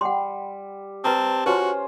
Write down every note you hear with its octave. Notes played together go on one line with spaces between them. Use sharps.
G3 F#5 C6
C4 B4 A5 A#5 D#6
C#4 F4 F#4 B4 C5